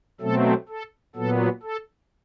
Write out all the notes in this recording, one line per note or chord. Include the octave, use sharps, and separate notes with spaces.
B2 F#3 A3 C4 A4
A4
A#2 F#3 B3 A4
A4